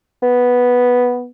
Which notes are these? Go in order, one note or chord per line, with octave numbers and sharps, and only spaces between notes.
B3